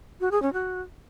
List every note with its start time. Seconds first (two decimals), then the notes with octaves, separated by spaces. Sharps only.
0.20 F#4
0.31 G#4
0.42 C#4
0.53 F#4